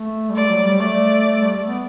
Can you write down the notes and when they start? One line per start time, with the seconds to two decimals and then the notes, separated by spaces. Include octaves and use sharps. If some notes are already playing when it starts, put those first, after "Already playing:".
Already playing: A3
0.30 G3
0.35 A3 D5
0.50 F#3
0.64 G3
0.79 A3 D5
1.43 G3
1.55 A3
1.68 B3